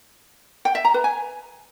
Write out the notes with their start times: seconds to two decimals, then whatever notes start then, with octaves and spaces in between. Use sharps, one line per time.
0.65 G5
0.75 E5
0.85 A#5
0.94 B4
1.04 G#5